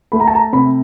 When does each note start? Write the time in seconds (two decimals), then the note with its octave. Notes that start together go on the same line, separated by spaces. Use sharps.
0.12 A3 B5
0.20 A#5
0.28 A5
0.35 A#5
0.53 C3 B5